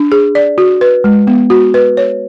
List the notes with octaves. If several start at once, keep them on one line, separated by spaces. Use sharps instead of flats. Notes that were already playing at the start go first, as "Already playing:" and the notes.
Already playing: D4
G#4
D5
F#4
B4
G#3
B3
F#4
B4
C#5